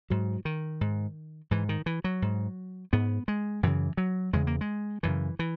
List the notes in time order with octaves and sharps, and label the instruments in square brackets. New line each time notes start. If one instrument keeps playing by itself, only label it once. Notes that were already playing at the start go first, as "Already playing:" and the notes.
[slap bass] G#2 F#3
D#3
G#2
G#2 E3
D#3
E3
F#3
G#2
G#2 B3
G#3
F#2 C#3 E3
F#3
E2 C#3 G#3
A#3
G#3
F#2 C#3 E3
E3